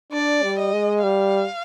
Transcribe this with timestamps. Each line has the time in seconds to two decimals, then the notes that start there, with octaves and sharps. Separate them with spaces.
0.13 D4 D5
0.43 G3
0.59 D#5
0.73 G#3
1.03 G3 F5